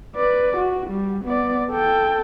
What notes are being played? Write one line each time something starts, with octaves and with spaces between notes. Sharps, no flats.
B4 D5
F#4
G3
B3 D5
A4 G5